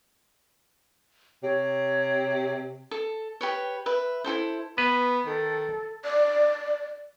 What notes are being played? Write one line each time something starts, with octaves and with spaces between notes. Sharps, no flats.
C3 C#5
A4
G4 B4 C#5
B4 E5
E4 F#4 A4 C5
B3 B4
D#3 A4
D5